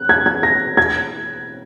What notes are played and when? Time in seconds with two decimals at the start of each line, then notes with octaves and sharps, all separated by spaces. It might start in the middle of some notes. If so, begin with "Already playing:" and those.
Already playing: F#6
0.09 G#6
0.26 G#6
0.43 A#6
0.77 G#6